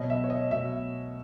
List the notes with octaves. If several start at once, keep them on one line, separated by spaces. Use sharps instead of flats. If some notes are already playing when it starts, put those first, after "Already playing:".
Already playing: B2 F#3 D#5
E5
C#5
D#5
B2 F#3 E5